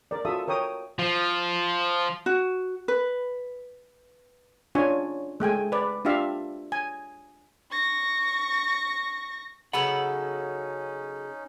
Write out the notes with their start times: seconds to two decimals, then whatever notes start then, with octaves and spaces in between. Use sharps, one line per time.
0.11 A#4 D5
0.25 F4 F#4 A4 E5 D#6
0.48 A#4 C#5 G5 D#6
0.99 F3
2.26 F#4
2.88 B4
4.75 C#4 D4 F4 C#5 G#5
5.40 G#3 A3 G5 G#5
5.72 B4 D5
6.05 D4 F4 G4 E5 F5
6.72 G#5
7.71 C#6 A#6
9.73 C#3 F#3 C#4 D#4 A4 F#5 B5